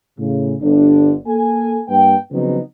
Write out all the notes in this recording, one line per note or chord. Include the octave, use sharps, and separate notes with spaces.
A2 C#3
G1 D3 D4
A#3 A4 G#5
G2 A#3 B4 G5
C#3 F3 F#3 B3 C4 D#4